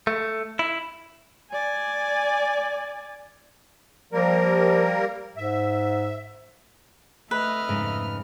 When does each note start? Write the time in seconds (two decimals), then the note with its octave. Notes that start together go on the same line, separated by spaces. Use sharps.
0.07 A3
0.59 E4
1.51 D5 G#5
4.13 F3 G3 A#3 A#4
5.37 G#2 E5
7.31 A3 B4 D#5 E5 F6
7.68 F2 G#2 C#3